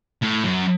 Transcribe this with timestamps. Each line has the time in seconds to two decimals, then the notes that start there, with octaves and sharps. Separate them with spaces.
0.22 A2
0.44 F#2